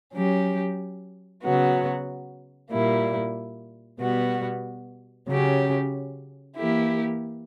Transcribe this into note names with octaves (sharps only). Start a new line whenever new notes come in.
F#3 C#4 G4
C#3 F#3 B3 F#4
A#2 G3 A#3 E4
B2 G3 B3 F#4
C#3 F#3 C#4 G4
E3 A#3 E4 G4